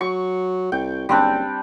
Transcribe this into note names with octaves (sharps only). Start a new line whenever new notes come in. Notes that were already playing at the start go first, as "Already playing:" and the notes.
F#3 C#6
C2 G5
F#1 G3 C4 D4